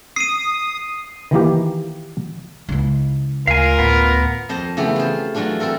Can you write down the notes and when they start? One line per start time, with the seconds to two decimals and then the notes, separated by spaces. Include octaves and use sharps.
0.16 D#6 C7 D#7
1.31 D#3 E3 A#3 G4
2.69 C#2 E4
3.47 D2 F4 A#4 F5 G#5
3.79 A1 B3
4.49 F2 C5 D#5 A5
4.77 C#3 E3 A3 B3 G4 G#4
4.96 F4 C5
5.35 E3 F#3 A3 D4 F4
5.60 C4 F4 A4 A#4